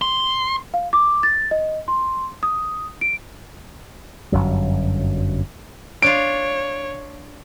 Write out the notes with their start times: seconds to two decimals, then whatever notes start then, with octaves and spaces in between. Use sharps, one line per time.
0.02 C6
0.74 F5
0.93 D6
1.23 A6
1.51 D#5
1.88 C6
2.43 D#6
3.01 D7
4.32 G1 F#2 F#3
6.02 D4 F4 C#5 D7